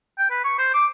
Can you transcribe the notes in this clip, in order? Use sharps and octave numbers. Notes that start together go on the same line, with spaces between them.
G5
B4
C#6
C5
D6